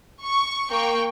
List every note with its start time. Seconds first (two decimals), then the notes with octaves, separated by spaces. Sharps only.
0.23 C#6
0.70 A#3 G5 C#6